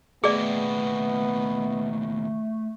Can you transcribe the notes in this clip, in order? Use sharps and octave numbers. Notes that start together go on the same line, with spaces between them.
D#2 B2 A3 B3 G#4 D5